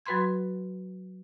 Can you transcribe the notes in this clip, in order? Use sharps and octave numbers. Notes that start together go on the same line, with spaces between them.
F#3 F#4 B4 B5 C6 G#6